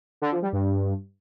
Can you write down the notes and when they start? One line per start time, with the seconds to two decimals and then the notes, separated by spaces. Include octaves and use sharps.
0.22 D3
0.32 F3
0.42 G3
0.53 G2